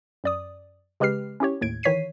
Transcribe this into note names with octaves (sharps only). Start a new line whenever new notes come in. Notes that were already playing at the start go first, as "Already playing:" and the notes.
F#2 D5 D#6
C#3 G#3 G4 B4 F6 C7
C#4 E4 G4 C#5
D#2 A2 G#6 D7
D#3 E3 C#5 B6 C7 D#7